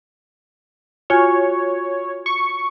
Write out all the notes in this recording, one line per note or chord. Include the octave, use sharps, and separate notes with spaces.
F4 F#4 C#5 G#5
C#6